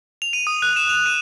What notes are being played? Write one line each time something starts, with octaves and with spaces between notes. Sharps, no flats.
F7
D#7
D#6
F#6
E7
F7
D#7